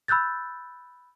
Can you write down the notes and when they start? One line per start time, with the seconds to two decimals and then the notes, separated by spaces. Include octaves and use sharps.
0.08 B5 E6 F#6 G6 A6